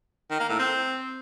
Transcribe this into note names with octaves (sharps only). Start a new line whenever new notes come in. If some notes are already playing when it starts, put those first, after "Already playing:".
D#3
A#3
A2
C4